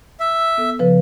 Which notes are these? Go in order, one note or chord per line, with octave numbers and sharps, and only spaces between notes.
E5
B3 A4
C#3 F3 B4